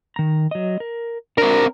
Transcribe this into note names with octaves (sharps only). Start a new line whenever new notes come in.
D#3 A#5
F#3 D#5
A#4
C4 D4 F#4 A#4